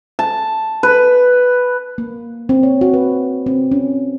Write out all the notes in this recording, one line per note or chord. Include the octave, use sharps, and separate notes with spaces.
A5
B4
A#3
C4
C#5
F#4
B4
C4
C#4